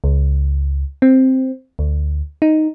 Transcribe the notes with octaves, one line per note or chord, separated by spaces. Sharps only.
C#2
C4
D2
D#4